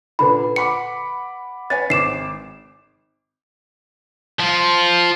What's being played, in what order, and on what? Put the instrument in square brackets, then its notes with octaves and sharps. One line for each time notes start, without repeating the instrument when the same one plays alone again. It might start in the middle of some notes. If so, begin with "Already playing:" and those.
[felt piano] A#2 D3 D4 [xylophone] B4 B5
[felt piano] F#5 B5 D6 [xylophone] C#7
[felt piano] B4 C#5 G#5 [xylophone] A6
[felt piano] G#1 D6 [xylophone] C7 E7
[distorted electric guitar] F3 F4